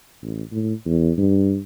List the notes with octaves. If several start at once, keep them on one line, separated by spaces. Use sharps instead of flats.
A1
A2
E2
G2